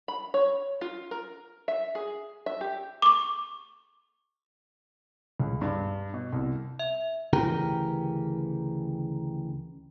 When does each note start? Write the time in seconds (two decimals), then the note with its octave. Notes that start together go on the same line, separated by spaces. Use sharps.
0.08 B5
0.34 C#5
0.81 F4
1.11 A#4
1.68 E5
1.95 G#4
2.46 E5
2.61 G4
3.02 C#6 D6
5.40 C#2
5.61 G2
6.14 B2
6.33 C2
6.79 E5
7.33 D2 C#3 E3 G4 A#4